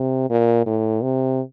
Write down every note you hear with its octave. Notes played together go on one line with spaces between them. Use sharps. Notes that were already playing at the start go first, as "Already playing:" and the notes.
Already playing: C3
A#2
A2
C3